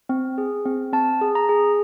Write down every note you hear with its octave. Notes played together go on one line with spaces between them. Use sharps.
C4
G#4
C4
C4 A5
G#4
A#5
G#4